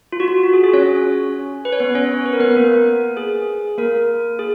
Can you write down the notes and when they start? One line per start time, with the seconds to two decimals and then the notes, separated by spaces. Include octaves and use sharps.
0.12 F4
0.20 F#4
0.28 F4
0.44 F#4
0.53 G#4
0.64 G#4
0.73 C#4 C#5
1.65 B4
1.73 C#5
1.80 B3 B4
1.95 C#4 C#5
2.26 B4
2.33 A#4
2.40 B3 B4
2.57 A#3 A#4
3.17 G#4
3.78 A#3 A#4
4.39 G#4